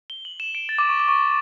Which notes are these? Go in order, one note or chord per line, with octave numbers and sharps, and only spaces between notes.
G7
F#7
E7
D7
A6
D6
C#6
D6
C#6
C#6